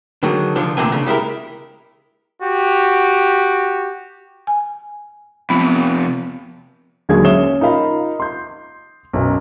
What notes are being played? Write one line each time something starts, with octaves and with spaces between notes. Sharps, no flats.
D3 D#3 F#3 G#4
C2 D3 F3 D4
D2 A#2 D3 E3 C4 G#5
C#3 D4
G3 G#3 E4 A#4
F#4 G4
G#5
F2 C3 B3
D#2 D3 F#3 G#3 G#4 G#6
C#4 C#5 E5 D#6 E7 G7
D#4 F4 A#4 F5 B5
C6 G6
B1 F#2